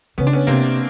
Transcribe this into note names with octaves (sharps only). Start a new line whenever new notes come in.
C#3 B3 C#4
D4
B3 C#4
C3 A#3 C4